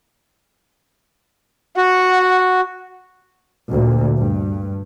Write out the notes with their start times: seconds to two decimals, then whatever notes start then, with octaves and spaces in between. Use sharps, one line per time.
1.77 F#4 F#5
3.71 D2 A#2
4.18 G2